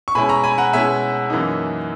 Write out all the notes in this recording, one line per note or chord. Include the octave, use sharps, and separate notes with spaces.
C#6
B2 G#3 C#4 E4 G#5 B5
A#5 C#6
G#5 B5
F#5 A#5
B2 G#3 C#4 E4 E5 G#5
F#2 E3 A#3 D#4